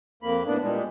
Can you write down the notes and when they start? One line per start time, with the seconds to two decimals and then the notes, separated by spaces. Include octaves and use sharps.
0.23 F2 A#3 B5
0.47 A2 B3 D4
0.62 A#2 G3 G#3